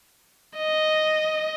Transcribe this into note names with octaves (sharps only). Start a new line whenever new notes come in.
D#5